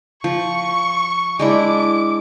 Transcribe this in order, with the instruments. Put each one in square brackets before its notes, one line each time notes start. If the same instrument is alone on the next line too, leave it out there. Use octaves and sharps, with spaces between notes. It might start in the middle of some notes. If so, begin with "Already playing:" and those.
[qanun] F3 [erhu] C#6
[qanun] G#3 D4 E4 [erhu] D6